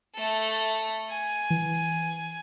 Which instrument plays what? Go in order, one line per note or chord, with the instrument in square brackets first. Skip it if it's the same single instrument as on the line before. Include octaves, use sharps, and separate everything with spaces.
[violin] A3 A4
G#5
[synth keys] E3